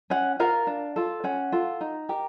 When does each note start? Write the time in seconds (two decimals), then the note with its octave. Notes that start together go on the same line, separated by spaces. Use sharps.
0.10 C#4 F#5
0.39 F4 A#4 F5
0.67 D4
0.96 F4 A4
1.24 C#4 F#5
1.52 F4 A4
1.81 D#4
2.09 G4 A#4